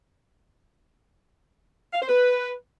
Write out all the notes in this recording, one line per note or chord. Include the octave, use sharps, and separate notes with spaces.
F5
C5
B4